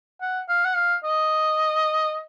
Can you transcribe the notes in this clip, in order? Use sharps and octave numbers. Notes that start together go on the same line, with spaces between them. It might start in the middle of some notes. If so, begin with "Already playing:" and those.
F#5
F5
F#5
F5
D#5